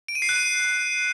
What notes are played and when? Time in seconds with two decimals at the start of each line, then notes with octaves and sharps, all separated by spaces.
0.08 D7
0.15 D#7
0.22 C7
0.29 F#6
0.36 D#7